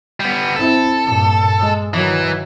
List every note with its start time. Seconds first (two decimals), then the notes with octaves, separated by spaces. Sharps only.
0.20 G3 B3
0.56 C4 E4 A4
1.04 G2 A#2
1.60 G#3
1.94 D#3 E3 F#3